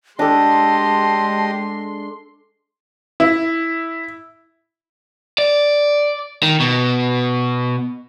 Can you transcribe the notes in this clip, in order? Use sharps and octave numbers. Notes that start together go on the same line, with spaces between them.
G#3 D4 G4 A4 D#5 A5 C6
E4
D5
D#3
B2